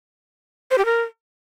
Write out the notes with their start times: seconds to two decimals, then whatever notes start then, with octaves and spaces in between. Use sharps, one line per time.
0.71 C5
0.78 G4
0.85 A#4